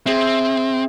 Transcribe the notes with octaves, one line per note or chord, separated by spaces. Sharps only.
C4 G#4 E5